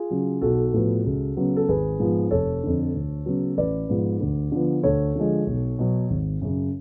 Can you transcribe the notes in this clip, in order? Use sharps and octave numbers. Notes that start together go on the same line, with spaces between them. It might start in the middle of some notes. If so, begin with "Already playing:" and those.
Already playing: F4 G#4
C#3 F#3
B1 F#4 A4
A2 F3 B3
C#2
C#3 F#3 B3
A4
G#1 G#4 B4
G#2 F3 B3
F1 A4 C#5
F2 D3
D2
C#3 F#3 B3
A1 B4 D5
G#2 F3 B3
D2
D3 F3 B3
D2 A4 C#5
D3 F3 G#3
B1
B2 F#3 B3
G#1
F#2 C#3